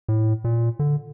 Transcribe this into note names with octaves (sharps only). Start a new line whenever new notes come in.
A2
A#2
D3